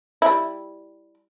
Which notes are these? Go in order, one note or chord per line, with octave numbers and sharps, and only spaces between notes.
G3 E4